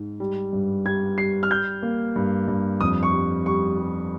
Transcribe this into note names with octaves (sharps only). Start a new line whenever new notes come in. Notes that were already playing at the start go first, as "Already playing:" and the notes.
Already playing: G#2
G3
G2
G3 G#6
G3 C7
F6
G3 G6
A#3
G2
G2
F2 D#6
C#6
G3
G3 C#6
G3